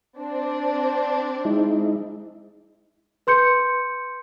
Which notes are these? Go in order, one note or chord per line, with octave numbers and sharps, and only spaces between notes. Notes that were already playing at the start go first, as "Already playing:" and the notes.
C4 D4
G#3 D#4 E4
B4 C6 G6 C#7